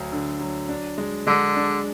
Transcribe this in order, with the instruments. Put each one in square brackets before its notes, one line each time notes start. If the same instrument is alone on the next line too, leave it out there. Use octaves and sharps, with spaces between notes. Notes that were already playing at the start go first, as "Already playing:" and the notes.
Already playing: [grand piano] D2 F#3
D3
F#3
D4
G#3
[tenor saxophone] D3 [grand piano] G#3
[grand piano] D4